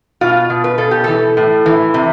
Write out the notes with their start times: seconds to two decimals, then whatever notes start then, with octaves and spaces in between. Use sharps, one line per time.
0.21 B2 F4
0.50 B2
0.64 B4
0.78 B2 A4
0.91 G4
1.04 E3 A4
1.37 A2
1.66 E3
1.94 C3